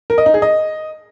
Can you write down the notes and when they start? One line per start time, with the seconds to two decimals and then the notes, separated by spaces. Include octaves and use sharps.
0.10 A#4
0.18 D#5
0.26 D#4
0.34 G#4
0.42 D#5